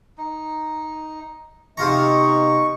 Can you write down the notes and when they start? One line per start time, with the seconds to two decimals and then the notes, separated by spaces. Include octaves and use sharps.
0.18 D#4
1.77 C3 B3 D#4 F4 D#5 A#5 C#6